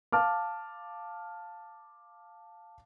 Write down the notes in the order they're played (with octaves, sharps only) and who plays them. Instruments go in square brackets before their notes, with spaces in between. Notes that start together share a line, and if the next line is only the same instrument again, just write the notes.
[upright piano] F5 A5 D6 F6